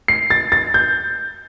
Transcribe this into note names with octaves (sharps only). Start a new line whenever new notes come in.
C7
A6
A6
G6